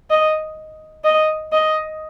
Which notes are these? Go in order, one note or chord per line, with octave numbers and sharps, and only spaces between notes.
D#5
D#5
D#5